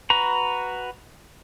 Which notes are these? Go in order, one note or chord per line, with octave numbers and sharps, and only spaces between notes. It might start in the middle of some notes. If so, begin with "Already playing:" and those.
F#4 B4 A#5